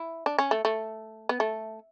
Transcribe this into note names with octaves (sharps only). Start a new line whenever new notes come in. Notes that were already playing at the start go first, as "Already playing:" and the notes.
Already playing: E4
D4
C#4
A3
A3
B3
A3